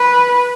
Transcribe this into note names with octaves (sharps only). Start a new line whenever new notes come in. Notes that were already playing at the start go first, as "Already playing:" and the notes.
Already playing: B4